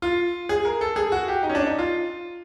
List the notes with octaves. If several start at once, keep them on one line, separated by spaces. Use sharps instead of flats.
F4
G#4
A#4
A4
G#4
F#4
G4
D#4
C#4
D4
D#4
F4